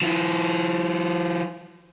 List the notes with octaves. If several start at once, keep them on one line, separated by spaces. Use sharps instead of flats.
F3 E4